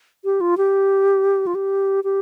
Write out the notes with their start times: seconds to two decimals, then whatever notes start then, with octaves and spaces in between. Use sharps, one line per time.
0.25 G4
0.41 F4
0.57 G4
1.47 F4
1.55 G4
2.04 G4